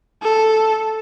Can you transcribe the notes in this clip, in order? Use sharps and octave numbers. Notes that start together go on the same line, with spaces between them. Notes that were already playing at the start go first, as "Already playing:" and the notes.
A4